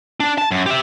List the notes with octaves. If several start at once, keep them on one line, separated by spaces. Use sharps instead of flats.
D4
A5
F#2
G4 E5